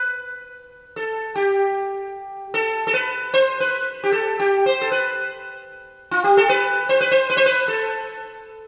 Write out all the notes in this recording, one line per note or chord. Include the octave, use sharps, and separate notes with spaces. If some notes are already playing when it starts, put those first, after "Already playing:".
Already playing: B4
A4
G4
A4
A4
B4
C5
B4
G4
A4
G4
C5
A4
B4
F4
G4
A4
B4
C5
B4
C5
B4
C5
B4
A4